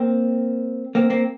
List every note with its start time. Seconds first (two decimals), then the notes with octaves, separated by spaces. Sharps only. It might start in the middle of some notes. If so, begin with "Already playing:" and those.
Already playing: A#3 C4
0.95 A#3 C4
1.10 A#3 C4